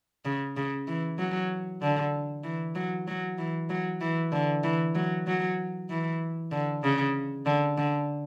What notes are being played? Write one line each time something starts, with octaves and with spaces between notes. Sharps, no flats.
C#3
C#3
E3
F#3
D3
E3
F#3
F#3
E3
F#3
E3
D3
E3
F#3
F#3
E3
D3
C#3
D3
D3